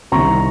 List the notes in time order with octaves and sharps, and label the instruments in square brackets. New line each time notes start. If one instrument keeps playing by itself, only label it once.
[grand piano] C2 C3 D#3 A#5 C#6